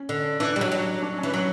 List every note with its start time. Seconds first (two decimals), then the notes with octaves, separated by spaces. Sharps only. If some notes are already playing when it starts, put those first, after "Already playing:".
Already playing: C#4
0.09 D3
0.40 E3 D4
0.56 G3
0.61 F#3
0.72 F#3
1.02 D4
1.18 E3 C#4
1.34 F#3